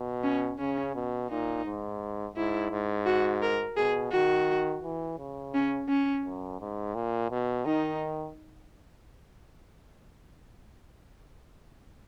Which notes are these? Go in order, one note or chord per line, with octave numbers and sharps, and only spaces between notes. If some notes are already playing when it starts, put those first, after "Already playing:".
Already playing: B2
C#4
C#3 C#4
B2
A#2 D#4
G#2
G#2 E4
G#2
F#4
A#4
B2 G#4
D#3 F#4
E3
C#3
C#4
C#4
F#2
G#2
A#2
B2
D#3 D#4